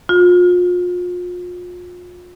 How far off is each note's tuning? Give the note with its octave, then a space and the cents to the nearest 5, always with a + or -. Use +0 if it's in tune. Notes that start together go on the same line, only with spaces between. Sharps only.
F4 +35